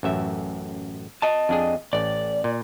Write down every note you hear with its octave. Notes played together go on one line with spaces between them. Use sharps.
A1 F#2 E5
D#5 A5
F2 D4 G#4
A1 D5
A#2